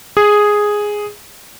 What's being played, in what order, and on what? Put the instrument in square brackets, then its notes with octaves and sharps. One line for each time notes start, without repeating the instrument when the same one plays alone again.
[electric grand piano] G#4